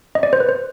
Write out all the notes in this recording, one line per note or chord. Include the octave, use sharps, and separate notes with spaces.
D#5
D5
C5
B4
C5